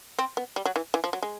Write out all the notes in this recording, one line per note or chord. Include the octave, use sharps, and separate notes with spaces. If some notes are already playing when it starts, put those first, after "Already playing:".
C4
B3
G3
F#3
E3
E3
F3
F#3
G#3